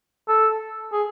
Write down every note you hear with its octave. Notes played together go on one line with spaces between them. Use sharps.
A4
G#4